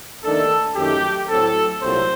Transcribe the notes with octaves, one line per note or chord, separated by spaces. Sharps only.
D#2 D#3 A3 D4 A4
F#2 D#3 A3 G4
A2 F#3 C4 A4
C2 A#2 F#3 A3 C4 C5